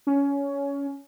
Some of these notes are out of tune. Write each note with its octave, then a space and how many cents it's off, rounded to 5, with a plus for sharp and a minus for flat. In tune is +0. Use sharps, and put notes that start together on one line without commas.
C#4 +20